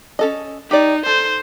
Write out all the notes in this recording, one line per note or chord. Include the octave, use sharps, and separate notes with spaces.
C#4 A4 D#5
D#4 G4 D5
A4 C5